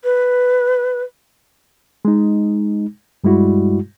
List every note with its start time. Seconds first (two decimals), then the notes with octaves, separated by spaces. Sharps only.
0.04 B4
2.05 G#3 D#4
3.24 G2 G3 G#3 E4 F#4